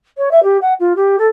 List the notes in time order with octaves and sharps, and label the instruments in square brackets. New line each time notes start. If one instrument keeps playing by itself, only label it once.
[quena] C#5
E5
G4
F#5
F4
G4
A4